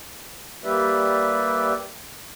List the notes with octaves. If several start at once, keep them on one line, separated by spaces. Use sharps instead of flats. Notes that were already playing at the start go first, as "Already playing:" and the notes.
G3 A#3 G4 B4 D5 E5